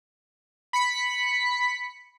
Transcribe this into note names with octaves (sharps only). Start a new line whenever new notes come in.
B5 B6 C#7